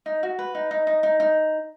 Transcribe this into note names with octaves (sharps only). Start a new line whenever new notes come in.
D#4
F#4
B4
D#4
D#4
D#4
D#4
D#4